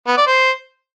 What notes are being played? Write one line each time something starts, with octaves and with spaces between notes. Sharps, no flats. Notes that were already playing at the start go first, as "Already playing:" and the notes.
B3
D5
C5